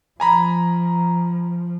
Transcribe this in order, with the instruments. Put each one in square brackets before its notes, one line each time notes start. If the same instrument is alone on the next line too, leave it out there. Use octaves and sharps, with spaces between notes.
[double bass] F3 [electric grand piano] G#5 A#5 B5